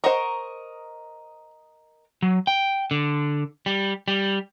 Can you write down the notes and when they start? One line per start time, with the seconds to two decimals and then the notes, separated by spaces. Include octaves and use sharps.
0.04 A#4 C5 D#5 F#5 A#5 C#6
2.22 F#3
2.47 G5
2.91 D3
3.66 G3
4.08 G3